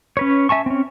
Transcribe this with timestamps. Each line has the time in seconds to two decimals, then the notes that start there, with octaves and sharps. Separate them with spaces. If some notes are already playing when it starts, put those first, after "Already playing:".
0.17 C#4 B4 C#5
0.49 E5 G#5 A5 C#6
0.66 C4 C#4